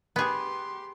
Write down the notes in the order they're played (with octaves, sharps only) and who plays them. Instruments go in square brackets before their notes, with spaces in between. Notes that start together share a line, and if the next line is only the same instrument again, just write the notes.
[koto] B3 G#4 [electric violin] G4 C6